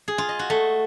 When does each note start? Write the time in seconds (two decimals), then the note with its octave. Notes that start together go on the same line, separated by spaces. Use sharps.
0.08 G#4
0.18 F4
0.29 D#5
0.39 F#4
0.50 A3